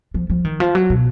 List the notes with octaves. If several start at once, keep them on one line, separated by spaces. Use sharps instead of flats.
F3
F3
D#3
F3
F#3
B2